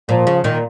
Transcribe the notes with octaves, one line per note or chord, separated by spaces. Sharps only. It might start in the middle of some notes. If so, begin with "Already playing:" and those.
A#2 F3
C#3
A#2 D#3